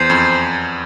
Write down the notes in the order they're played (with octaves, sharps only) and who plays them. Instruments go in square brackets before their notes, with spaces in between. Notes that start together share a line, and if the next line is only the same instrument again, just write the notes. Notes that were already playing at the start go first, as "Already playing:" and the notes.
Already playing: [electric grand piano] E2 [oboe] C5
[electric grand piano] F2